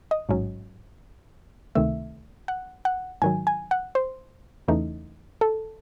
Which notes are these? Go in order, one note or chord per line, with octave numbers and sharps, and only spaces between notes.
D#5
A1 G#2 F#3 C#4
C#2 C3 D#3 A3 E5
F#5
F#5
G#2 D#3 F#3 G#5
G#5
F#5
C5
E2 C#3 E3 A3 D#4
A4